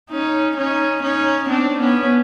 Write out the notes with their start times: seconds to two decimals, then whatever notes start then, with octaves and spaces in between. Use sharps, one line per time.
0.10 C#4 D#4
0.57 C#4 D#4
1.02 C#4 D#4
1.49 C4 D4
1.79 B3 C#4